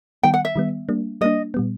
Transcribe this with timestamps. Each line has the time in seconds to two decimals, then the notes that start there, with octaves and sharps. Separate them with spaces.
0.23 D#3 G3 B3 G5
0.34 F#5
0.45 E5
0.56 D#3 G3 B3
0.89 G3 A#3 D4
1.21 G3 A#3 D4 D#5
1.54 A#2 G3 B3